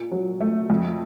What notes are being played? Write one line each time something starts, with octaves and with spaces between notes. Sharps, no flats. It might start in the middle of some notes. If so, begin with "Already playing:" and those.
Already playing: A#2
F#3
A3
F2